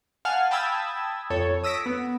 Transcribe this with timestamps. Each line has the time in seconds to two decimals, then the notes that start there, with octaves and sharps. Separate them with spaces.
0.25 F5 F#5 G#5 A5 F6
0.51 G5 A5 B5 D#6 E6 G#6
1.30 F2 A4 C#5
1.63 D#6 E6 A#6 B6 D7
1.86 B3